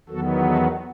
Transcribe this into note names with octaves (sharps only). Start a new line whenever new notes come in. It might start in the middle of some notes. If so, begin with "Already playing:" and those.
E2 D#3 F#3 B3 F#4 A4
F#4 A4